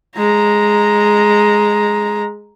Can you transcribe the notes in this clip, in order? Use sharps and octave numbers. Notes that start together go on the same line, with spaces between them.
G#3 A#5